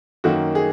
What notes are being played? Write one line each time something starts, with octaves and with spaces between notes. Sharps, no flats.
F#2 D#3 A#3 F#4
G#4